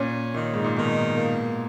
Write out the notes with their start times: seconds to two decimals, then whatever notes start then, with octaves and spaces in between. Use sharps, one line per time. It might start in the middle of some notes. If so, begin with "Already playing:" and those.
Already playing: A#2 C#4
0.34 A#2 D#3
0.54 G#2
0.64 A#2
0.76 B2 D#3
1.17 A#3